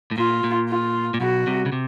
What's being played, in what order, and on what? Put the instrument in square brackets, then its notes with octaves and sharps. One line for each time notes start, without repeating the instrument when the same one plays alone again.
[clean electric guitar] A2
[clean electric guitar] A#2 [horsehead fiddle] F4
[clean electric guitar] A#2
[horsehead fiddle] F4
[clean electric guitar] A#2
[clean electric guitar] B1 B2 [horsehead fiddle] F#4
[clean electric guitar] C2 C3
C#3
C3